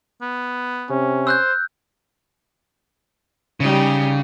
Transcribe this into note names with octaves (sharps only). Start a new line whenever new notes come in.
B3
C3 C#4
C5 E6 F#6 G6
C#3 G3 D#4